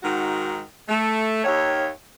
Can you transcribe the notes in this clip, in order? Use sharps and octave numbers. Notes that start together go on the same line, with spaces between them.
G#2 D#3 F#4
A3
D#2 C#5